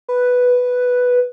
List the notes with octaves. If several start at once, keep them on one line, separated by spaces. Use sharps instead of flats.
B4